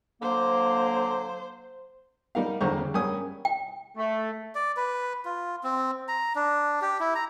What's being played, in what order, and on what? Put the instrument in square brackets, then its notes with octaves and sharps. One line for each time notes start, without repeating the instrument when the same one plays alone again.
[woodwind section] D3 F#3 A#3 [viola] C5
[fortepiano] G3 D#4 A#4 F5
E2 G2 D3 C5 A#5 C#6
C#3
G2 A#3 C#4 G#5 D#6
[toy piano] G5
[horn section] A3
[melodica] D5
B4
F4
C4
A#5
D4
G4
E4
A#5